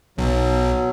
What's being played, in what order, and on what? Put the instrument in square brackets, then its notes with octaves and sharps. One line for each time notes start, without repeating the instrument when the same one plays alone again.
[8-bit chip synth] B1 [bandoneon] B2 F#3